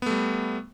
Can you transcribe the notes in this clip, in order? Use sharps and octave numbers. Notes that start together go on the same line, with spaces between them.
G3 A3 B3